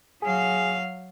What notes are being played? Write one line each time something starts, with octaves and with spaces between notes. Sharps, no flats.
F#3 G#4 F5